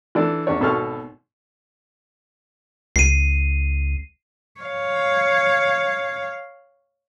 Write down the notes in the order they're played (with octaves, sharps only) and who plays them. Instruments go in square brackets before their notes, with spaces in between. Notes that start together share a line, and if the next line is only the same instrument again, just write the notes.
[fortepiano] E3 D4 A4
E2 C#4 D4 C#5
G#1 B2 A4 A5 C#6 F6
[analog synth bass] C#2 [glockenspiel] C7 D#7
[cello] C#5 F5